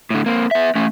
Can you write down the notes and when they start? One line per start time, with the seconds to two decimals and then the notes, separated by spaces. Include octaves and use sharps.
0.10 A2 D3
0.26 A#3 C4
0.51 B3 E5
0.75 A3 C#4